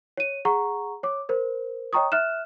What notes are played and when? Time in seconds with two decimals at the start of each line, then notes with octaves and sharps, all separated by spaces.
0.17 C#5 D#7
0.45 G#4 F#5 A#5 C#6
1.03 C#5 D6
1.29 A#4 C5
1.93 C#5 D#5 G5 A#5 C#6 D#6
2.12 E5 F6 F#6 E7